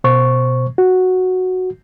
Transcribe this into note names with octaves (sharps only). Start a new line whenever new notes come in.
B2 C5 C#6
F#4